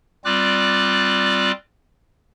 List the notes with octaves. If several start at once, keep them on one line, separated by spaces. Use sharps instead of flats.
G3 C4 F4 D5 D6 F#6